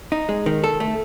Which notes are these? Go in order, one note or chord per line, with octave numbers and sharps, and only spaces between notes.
D#4
G#3
D#3
A4
A3